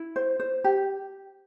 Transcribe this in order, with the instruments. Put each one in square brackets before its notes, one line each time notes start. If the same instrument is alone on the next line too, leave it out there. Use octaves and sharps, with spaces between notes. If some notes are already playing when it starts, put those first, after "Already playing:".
Already playing: [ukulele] E4
C5
C5
G4